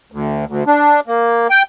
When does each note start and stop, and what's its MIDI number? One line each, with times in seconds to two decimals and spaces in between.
0.12 0.45 38
0.47 0.64 38
0.67 1.00 62
1.07 1.47 58
1.50 1.63 79